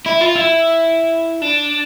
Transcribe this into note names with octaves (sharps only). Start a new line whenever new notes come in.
E4
F4
E4
D4